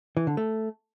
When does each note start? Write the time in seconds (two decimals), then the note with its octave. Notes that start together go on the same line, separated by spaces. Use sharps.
0.17 E3
0.27 D3
0.37 A3